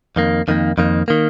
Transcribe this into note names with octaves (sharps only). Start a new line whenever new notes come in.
F2 D#3 A#3
F2 D#3 A#3
F2 D#3 A#3
D#3 A#3